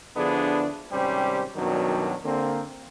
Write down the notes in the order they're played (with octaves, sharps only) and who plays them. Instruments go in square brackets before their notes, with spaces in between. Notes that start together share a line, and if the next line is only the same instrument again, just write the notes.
[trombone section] D3 F3 B3 D4 E4 G#4
G#1 C3 G3 C#4 G4 C5
F#2 B2 D#3 F#3 G3 D4
D3 A#3 C4